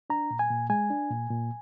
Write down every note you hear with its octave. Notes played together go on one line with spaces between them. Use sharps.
D4 A#5
A#2
G#5
A#2
G#3 G#5
D4
A#2
A#2